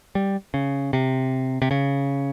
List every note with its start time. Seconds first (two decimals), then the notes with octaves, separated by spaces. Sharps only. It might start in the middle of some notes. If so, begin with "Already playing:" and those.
0.15 G3
0.54 C#3
0.93 C3
1.62 C3
1.71 C#3